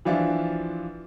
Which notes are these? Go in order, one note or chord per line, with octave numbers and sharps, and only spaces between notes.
E3 F3 D4 F4 F#4 E5